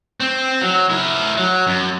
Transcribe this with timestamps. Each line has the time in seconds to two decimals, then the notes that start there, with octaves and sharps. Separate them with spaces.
0.20 C4
0.61 F#3
0.90 E4 A#4
1.37 F#3
1.67 F#2